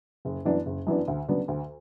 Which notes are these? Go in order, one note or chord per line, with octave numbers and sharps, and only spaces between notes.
F#1
F#2 E3 B3 D4
F#1
F#2 E3 B3 D4
D2
C#3 F#3 B3 D4
D2